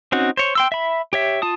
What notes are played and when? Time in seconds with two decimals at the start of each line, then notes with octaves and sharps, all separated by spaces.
0.12 C4 C#4 D#4 F#4
0.37 C5 C#5
0.55 G5 C6 E6
0.72 E5 B5
1.13 G4 C#5 E5
1.42 F4 A5 D#6